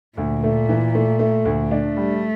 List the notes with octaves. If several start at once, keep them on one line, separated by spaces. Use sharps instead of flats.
D2 A#2
A3
E3
A3
A3
D2
A3 D4
G3